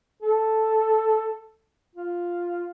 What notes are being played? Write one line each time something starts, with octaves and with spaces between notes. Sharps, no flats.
A4
F4